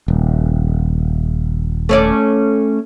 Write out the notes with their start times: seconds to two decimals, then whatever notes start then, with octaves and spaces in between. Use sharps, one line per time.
0.08 D#1
1.89 A3 C#4 D5